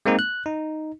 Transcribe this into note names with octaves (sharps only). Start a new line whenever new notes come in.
G#3 A#3 C4 D#4
F#6
D#4